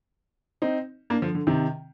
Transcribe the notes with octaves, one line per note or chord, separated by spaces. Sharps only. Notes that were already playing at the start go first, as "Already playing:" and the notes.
C4 D#4
A#3 D4
D3 F3
D3
C3 D#3